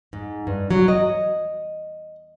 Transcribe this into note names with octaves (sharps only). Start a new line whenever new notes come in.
G#2
G2
F#3
D#5